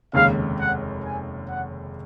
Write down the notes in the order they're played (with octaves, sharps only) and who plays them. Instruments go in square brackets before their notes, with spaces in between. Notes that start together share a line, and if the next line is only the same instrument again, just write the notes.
[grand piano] F1 D#2 C#3 G#3 [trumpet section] F5
[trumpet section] F#5
G#5
F#5